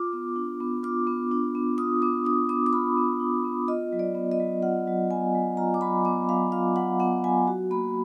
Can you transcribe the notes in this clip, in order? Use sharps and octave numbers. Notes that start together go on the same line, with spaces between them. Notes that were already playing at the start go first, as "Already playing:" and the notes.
Already playing: F4 D6
B3
D4
B3
F4 D6
B3
D4
B3
F4 D#6
B3 D6
D4 D#6
B3 D6
D6
F4 B5
B3
D4
B3
F4 D#5
F#3
D5
B3
D#5
F#3
F4 F#5
F#3
B3 G#5
F#3
F4 A#5
D6
F#3 B5
B3 D6
F#3 F5
F4 F5
F#3 F#5
B3 F#5
F#3 G#5
F#4
A#3 B5